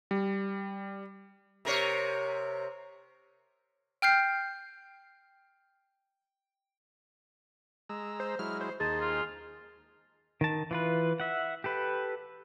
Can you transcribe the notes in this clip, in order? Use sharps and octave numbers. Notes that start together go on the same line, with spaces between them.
G3
C3 A#4 C#5
G5 F6 G6 C7
G#3 A#5 E6
C5
F#3 G#3 E4 F6
C5
D#2 D#4 G#4 C5 A5
F4
D#3 A5
E3 F4 B4
E5 F#5
G4 A4 B4